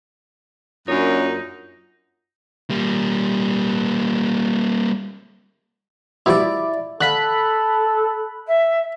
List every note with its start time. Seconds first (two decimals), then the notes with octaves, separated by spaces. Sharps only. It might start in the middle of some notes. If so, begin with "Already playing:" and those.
0.88 F#2 A#2 D4 D#4 C#5
2.70 G3 A#3
6.26 B2 F3 G3 E4 D5
7.01 D3 A4 F5 B5 F#6
8.47 E5